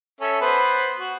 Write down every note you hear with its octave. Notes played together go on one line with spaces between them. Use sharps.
C#4 A4 E5
B3 B4 C5
F#4